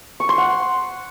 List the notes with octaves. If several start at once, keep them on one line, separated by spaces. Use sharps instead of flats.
C#6
C6
F#5